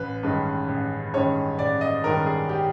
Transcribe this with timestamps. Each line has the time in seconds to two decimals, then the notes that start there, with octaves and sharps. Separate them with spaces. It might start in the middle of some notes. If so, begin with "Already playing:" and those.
Already playing: A1 B4
0.23 G2 D#3 G#3 C#4
0.69 A1
1.13 G2 D#3 G#3 C#4 C#5
1.59 A1 D5
1.81 D#5
2.04 G2 D#3 G#3 C#4 A#4
2.26 G#4
2.49 G4